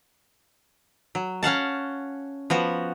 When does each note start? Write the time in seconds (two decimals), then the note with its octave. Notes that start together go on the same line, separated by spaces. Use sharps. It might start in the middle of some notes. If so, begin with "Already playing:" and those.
1.15 F#3
1.43 C#4 F5 F#5 A5
2.50 F3 B3 F#4